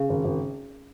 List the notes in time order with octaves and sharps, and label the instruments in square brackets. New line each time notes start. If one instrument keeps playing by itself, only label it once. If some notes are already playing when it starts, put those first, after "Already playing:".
Already playing: [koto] C#3
[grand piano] G#1
G#1